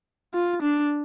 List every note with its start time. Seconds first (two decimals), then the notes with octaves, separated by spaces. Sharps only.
0.34 F4
0.63 D4